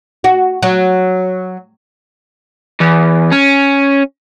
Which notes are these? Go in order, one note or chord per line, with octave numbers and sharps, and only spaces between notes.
F#4
F#3
E2
C#4